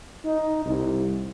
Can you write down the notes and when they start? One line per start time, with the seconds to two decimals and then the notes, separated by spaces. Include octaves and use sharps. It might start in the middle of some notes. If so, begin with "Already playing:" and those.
0.25 D#4
0.66 C2